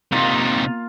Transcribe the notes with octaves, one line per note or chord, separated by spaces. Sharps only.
C3 A#3 D#4 F4